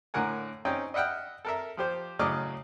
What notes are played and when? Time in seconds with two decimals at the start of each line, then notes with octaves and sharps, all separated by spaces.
0.14 A2 D3 A#4 F#5 G#5
0.65 C4 C#4 D#4 G5
0.94 D#5 E5 F#5 G5 F6
1.45 A4 A#4 E5
1.77 F3 G4 C5
2.19 A2 C#3 F#3 D#5 D6 F6